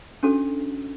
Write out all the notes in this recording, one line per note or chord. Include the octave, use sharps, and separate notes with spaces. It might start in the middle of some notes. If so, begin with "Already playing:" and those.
C#4 D4 F#4 A4